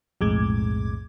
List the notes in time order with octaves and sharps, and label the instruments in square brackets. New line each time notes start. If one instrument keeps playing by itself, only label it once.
[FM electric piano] B1 F2 A2 G#3 D6 G#6